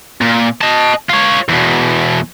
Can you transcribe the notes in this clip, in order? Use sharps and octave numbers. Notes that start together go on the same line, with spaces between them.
A#2
D#5 A5
F4 C#5
E2 B2